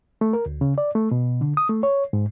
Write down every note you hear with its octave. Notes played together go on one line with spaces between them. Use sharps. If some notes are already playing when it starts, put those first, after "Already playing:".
A3
A#4
D2
C#3
D5
A3
B2
D3
D#6
A3
C#5
G#2